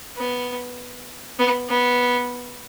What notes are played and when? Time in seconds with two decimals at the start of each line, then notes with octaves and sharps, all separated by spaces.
0.17 B3
1.39 B3
1.69 B3